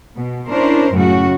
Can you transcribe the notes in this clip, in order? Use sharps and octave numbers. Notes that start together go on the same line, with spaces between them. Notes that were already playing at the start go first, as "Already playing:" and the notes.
B2
C#4 D4 E4 A#4 C5
F#2 A2 C#3 A3 F#4